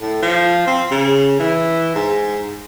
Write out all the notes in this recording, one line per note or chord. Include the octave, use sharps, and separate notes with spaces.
A2
F3
C4
C#3
E3
G#2